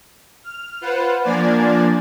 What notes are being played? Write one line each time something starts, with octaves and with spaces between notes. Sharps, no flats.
F6
F4 B4 C5 F#5
F3 A#3 D4 D5 G#5 A6